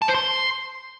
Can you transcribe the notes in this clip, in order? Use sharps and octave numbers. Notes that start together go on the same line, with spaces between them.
A5
C5
C6